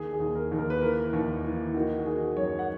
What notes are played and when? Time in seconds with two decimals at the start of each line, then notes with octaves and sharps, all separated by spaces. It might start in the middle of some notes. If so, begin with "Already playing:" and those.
Already playing: D#2 G#4
0.13 G#4
0.20 D#2
0.35 A#4
0.52 D#2
0.58 A#4
0.70 B4
0.81 E3 A#4
1.13 D#2
1.45 E3
1.74 D#3 F#4
2.00 F#4
2.05 D#3 G#4
2.37 F#2 C#5
2.59 F#5